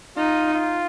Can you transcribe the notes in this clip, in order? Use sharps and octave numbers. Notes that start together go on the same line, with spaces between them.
D#4 F4
F4